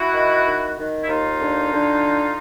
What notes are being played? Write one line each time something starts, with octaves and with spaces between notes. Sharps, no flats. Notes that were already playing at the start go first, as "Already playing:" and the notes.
Already playing: E4 F#4
D#3
D#3
D#3
E4
D#2 D#4 F4
D3
D3